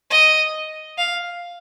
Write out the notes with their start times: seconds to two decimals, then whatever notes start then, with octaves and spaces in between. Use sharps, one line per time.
0.10 D#5
0.98 F5